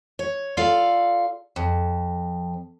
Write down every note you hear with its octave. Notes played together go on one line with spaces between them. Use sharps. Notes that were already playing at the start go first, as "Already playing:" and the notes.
C#5
F4 A4 D5 F5
F2